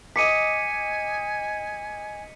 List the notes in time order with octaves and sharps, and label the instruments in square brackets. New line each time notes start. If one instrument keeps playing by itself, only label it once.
[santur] D#5 D6 [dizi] G#5 [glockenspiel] B6 C#7 D#7